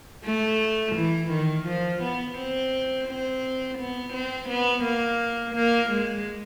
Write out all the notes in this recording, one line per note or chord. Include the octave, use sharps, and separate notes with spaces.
A3
E3
D#3
F3
B3
C4
C4
B3
C4
B3
A#3
A#3
G#3